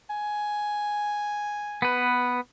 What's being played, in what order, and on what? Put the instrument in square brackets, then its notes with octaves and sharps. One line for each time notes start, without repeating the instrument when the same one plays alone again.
[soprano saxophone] G#5
[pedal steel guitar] B3 B4